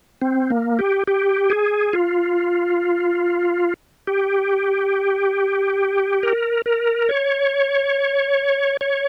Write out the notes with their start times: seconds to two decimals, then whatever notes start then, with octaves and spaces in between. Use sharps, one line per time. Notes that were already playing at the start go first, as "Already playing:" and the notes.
0.22 C4
0.50 A#3
0.79 G4
1.07 G4
1.50 G#4
1.93 F4
4.07 G4
6.23 A#4
6.66 A#4
7.09 C#5
8.81 C#5